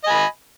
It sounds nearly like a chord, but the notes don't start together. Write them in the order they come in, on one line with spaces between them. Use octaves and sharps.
D#5 G#5 B5